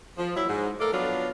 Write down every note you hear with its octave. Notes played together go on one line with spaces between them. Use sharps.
F3
A#2 F#3 E4
G#2
A3 A4 A#4 D5 F5
F3 F#3 B3 D4 F4